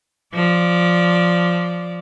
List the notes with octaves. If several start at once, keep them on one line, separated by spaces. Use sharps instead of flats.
F3 D5